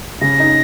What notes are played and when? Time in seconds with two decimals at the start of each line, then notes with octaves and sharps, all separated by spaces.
0.21 C#3 A#6
0.40 D#4